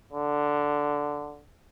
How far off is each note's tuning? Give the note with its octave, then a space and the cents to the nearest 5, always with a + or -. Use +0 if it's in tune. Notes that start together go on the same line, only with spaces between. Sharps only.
D3 +0